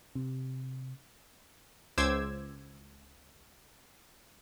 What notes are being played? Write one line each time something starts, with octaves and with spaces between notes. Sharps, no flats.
C3
C#2 C5 D6 E6 G#6